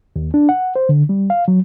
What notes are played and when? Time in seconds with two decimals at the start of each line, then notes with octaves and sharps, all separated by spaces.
0.16 D#2
0.34 D4
0.49 F#5
0.76 C5
0.89 D3
1.09 G3
1.30 F5
1.48 F#3